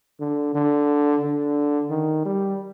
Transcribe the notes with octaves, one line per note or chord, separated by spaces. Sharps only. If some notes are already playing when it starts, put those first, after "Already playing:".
D3
D3
D3
D#3
G3